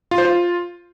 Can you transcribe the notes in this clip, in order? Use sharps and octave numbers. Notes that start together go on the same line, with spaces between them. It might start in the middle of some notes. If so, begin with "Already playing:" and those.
F4
C5
F4